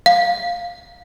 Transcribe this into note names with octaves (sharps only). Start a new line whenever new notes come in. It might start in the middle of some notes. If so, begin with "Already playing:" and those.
F5